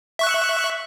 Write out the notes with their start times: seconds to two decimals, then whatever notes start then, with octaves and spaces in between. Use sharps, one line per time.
0.19 E5 C#6 F#6